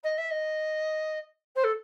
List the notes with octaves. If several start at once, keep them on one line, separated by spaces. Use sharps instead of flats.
D#5
E5
D#5
C5
A4